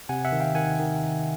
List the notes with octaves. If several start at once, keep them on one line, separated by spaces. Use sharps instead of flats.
C3 F#5 G#5
E5 F#5
D#3
F5 G5
D#3 F#5 G#5
D#3